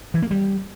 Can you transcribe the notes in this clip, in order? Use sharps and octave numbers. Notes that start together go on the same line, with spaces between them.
E3
A#3
G3